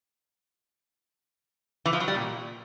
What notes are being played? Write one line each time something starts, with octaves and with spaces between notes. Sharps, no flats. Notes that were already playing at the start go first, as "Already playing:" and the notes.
E3
F3
F#3
G3
A#2